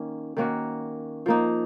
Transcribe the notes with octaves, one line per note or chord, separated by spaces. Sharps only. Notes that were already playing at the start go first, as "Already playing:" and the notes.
Already playing: D#3 A#3 C#4
D#3 A#3 C#4 F#4
F3 A#3 D#4